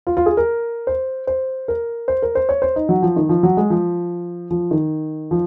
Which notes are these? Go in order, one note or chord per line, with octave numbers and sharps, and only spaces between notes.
F4
F4
G#4
A#4
C5
C5
A#4
C5
A#4
C5
C#5
C5
D#4
F#3
F3
D#3
F3
F#3
G#3
F3
F3
D#3
F3